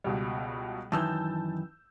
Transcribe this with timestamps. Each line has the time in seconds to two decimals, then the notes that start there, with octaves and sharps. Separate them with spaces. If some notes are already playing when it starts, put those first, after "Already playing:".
0.04 C#2 B2 G3
0.92 F#2 D#3 E3 A5 E6 G6